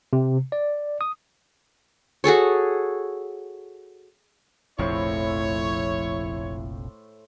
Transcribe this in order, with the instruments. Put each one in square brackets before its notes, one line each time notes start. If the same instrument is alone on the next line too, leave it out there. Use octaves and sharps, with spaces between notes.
[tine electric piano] C3
D5
D#6
[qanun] F#4 G#4 A4 C#5
[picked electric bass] F1 A#1 F2 [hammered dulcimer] A2 C5 C#6 [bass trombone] E4 [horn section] C#5